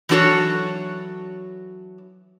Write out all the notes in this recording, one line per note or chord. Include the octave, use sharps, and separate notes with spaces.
E3 F#3 D4 F#4 A4 C#5